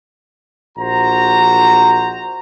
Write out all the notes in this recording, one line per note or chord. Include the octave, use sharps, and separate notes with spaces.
A#1 F#4 C5 A#5